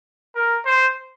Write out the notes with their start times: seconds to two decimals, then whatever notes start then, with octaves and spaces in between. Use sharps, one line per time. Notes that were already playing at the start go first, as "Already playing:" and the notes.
0.36 A#4
0.66 C5